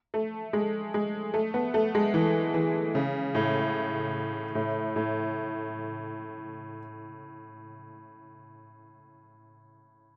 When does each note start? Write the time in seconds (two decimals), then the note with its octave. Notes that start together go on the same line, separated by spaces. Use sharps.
0.14 A3
0.53 G#3
0.94 G#3
1.34 A3
1.54 B3
1.74 A3
1.95 G#3
2.14 E3
2.54 E3
2.95 C#3
3.35 A2
4.55 A2
4.96 A2